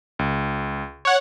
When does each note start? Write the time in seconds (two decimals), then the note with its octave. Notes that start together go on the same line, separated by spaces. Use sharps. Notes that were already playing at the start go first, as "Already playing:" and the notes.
0.19 C#2
1.05 C#5 F#5